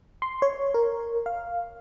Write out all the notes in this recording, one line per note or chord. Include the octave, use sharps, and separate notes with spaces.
C6
C#5
A#4
F5